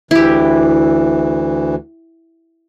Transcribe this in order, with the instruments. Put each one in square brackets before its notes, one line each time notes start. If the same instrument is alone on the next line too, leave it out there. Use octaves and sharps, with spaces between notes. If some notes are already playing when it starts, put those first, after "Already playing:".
[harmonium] D2 E3 [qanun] E4 G4